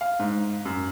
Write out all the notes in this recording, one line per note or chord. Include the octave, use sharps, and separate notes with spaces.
F5
G#2
F#2